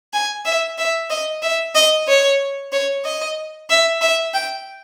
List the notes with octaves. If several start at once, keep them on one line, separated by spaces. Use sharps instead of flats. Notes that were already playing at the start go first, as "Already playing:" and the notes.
G#5
E5
E5
D#5
E5
D#5
C#5
C#5
D#5
E5
E5
G5